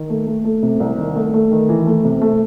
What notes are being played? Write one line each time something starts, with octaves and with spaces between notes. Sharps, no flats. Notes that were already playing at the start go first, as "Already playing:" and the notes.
Already playing: D#3
A3
A3
A3
C3
C2
D#3
A3
A3
D#3
E3
A3
C3
A3